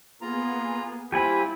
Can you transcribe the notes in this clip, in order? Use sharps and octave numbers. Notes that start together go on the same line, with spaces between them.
A#3 B3 F4 G#4 A#5
G3 C4 E4 F4 G4 G#5 B5